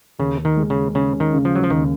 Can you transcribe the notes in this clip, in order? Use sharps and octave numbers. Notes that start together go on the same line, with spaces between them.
D#2 C#3
D#3
G#3
C#3
C#3 C#4
D#3
C#3
F3
F#3
F3
D#2 D#3